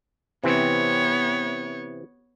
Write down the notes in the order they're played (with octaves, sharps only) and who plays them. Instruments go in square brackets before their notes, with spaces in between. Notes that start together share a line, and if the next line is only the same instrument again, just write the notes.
[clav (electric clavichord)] C3 E3 C4 [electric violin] B3 C#5